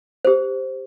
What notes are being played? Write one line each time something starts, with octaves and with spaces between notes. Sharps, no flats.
G4 C5